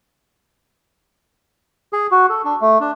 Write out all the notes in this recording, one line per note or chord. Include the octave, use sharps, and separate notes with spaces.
G#4
F#4
A4
D4
A3
D4